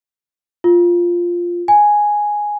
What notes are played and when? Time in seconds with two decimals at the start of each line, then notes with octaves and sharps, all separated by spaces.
0.64 F4
1.68 G#5